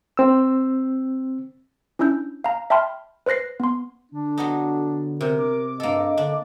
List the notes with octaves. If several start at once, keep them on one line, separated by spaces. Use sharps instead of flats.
C4 E6
C#4 D4 E4 E6 G6
F5 A#5
E5 G5 A5 B5 C6 F6
B4 C5 F#6 A#6 C7
B3 C6
D3 D4
F#3 B3 D#4
C3 A#4
D6
G2 A#3 A4 D#5
D3 D4